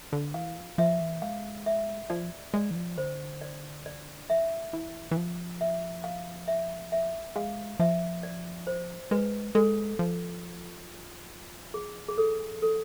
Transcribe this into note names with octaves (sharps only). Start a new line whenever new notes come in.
D3
E3 F5
F3
F3 E5
E3
G#3 F5
E5
F3 D5
G#3 D5
E3
F3
D3 C5
D5
D5
E5
E3
E3
F3
E5
F5
E5
E5
G#3 F5
F3 E5
D5
C5
G#3 B4
G#3 A4
F3
G#4
G#4
A4
A4